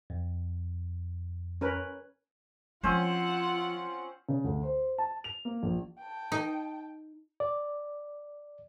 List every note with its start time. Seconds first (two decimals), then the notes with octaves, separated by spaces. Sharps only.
0.10 F2
1.61 C#4 A#4 B4
2.84 F3 C4 C#4 F4 C5 F#5
4.29 C#3
4.44 D2
4.63 C5
4.98 A5
5.24 F7
5.45 A#3
5.63 A#1
5.99 G5 A5
6.32 D#4
7.40 D5